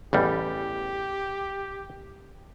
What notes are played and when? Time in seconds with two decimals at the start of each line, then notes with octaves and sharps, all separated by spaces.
0.13 A1 E2 G3 G4